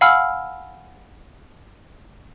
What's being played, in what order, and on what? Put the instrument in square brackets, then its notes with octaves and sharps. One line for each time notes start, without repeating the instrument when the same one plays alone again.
[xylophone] F5 F#5 G#5 B5 E6 F6